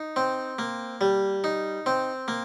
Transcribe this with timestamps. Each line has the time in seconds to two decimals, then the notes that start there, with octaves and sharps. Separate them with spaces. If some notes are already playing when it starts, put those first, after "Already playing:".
Already playing: D#4
0.16 C4
0.59 A#3
1.01 G3
1.44 D#4
1.86 C4
2.28 A#3